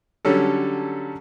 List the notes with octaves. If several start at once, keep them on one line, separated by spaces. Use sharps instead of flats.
D3 F#3 G3 C#4 A4